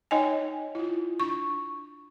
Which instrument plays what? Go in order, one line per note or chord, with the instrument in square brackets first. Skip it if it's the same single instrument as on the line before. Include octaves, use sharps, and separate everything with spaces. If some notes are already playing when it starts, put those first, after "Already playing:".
[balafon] D#4 C#5 D#5 G5 G#5
E4 F4
D4 C#6